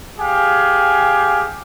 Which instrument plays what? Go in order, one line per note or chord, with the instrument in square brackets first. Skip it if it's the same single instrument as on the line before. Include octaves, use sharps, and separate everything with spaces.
[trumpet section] G4 G#4 F5 G#5